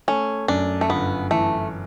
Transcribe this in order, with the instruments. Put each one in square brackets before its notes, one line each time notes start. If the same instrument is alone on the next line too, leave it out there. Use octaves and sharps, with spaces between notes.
[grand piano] A3 [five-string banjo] C#4
[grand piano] F#2 [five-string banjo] D4
[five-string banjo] A3
[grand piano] G1 [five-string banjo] B3
[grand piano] E3 [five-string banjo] A3